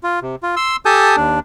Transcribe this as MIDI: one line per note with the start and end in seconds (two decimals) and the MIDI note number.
0.03 0.19 65
0.22 0.36 48
0.43 0.55 65
0.56 0.76 84
0.56 0.76 88
0.85 1.16 67
0.85 1.16 69
0.85 1.16 80
0.85 1.16 81
0.85 1.16 87
0.85 1.16 91
1.16 1.39 39
1.16 1.39 62